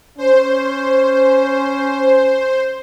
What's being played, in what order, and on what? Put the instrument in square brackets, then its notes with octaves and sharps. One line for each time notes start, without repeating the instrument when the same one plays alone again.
[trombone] C#4 [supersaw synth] C5